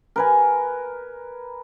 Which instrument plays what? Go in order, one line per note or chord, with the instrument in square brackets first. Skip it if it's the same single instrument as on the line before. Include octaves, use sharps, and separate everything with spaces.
[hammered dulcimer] A#4 B4 G#5